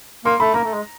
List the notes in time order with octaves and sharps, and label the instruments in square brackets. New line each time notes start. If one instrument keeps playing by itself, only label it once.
[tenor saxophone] A#3 [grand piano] C6
[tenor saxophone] A3 [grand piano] B5
[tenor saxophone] A#3 [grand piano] A#5
[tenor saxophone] A3
G#3